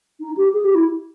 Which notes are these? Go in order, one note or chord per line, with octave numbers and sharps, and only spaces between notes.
D#4
G4
G#4
G4
E4